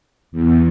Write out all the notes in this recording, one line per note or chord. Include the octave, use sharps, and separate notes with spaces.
E2